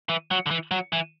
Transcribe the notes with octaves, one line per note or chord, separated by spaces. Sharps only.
E3
F#3
D3
E3
F#3
E3